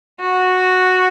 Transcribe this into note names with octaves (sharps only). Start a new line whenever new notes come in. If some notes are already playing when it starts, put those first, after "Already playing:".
F#4